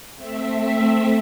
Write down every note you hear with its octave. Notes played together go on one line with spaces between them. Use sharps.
A3 C4 E5